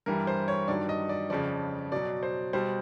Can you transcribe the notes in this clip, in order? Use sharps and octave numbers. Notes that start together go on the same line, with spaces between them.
G2 E3 G3 A#4
C5
C#5
G2 D#3 F#3 D5
D#5
D5
F2 C#3 F3 D5
B2 F#3 D5
C5
B2 G3 C5